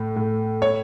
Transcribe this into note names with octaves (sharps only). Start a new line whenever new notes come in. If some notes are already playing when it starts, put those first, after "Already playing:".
Already playing: A2
A2
C#5